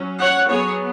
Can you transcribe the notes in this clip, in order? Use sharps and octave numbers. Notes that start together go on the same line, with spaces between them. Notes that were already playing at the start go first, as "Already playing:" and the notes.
Already playing: F#3 C#4
C#5 F#5
F#3 B3 G#4 C#5